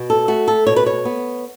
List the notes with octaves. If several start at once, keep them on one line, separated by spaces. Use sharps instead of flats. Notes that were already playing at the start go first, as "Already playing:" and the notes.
Already playing: B2
A4
A3 F#4
A4
B2 C#5
B4
C#5
B3